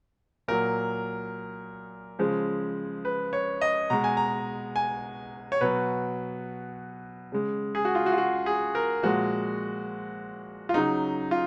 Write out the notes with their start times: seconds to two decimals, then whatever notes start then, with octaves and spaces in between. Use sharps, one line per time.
0.48 A#2 F#3 A#4
2.19 C#3 F3 G#3
3.05 B4
3.33 C#5
3.61 D#5
3.90 B2 G#3 A#5
4.04 G#5
4.17 A#5
4.76 G#5
5.52 C#5
5.61 B2 F#3 B4
7.32 C#3 G#3
7.75 G#4
7.85 F#4
7.95 F4
8.06 F#4
8.12 F4
8.18 F#4
8.46 G#4
8.75 A#4
9.03 A#2 F3 G#3 F#4
10.69 F4
10.74 C#3 F#3 D#4
11.31 F4